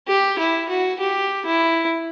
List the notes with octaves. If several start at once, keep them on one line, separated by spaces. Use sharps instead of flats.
G4
E4
F#4
G4
E4